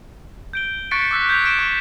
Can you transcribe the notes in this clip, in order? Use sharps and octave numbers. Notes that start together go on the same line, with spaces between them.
G6 D7 G7
C#6 F#6 A6 B6 C#7 D7
D6 E6 F#6 B6
G6 G#6 B6 F7
D6 D7 E7 G7
C#6